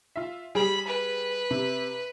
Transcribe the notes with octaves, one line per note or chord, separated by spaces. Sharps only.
F4 E5
G3 G#4 B5
B4
C3